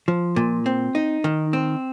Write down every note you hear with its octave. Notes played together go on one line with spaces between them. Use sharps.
F3
A#2
C4
D#4
D#3
C4